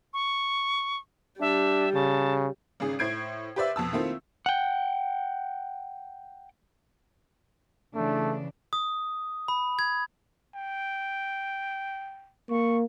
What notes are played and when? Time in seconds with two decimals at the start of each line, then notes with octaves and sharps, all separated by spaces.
0.14 C#6
1.41 G3 D4 E5
1.94 C#3 A5
2.80 G#1 C#3 G#4
2.99 A2 C5 G#6 C7 D7
3.56 G4 B4 C5 D5 E5
3.76 F2 B2 A5 E6
3.93 D#3 A3 A#3 C4 E4 F4
4.46 F#5 G5
7.95 C#3 E3 A3 D4
8.73 D#6
9.48 B5
9.79 G#6
10.55 G5
12.50 A#3 C#6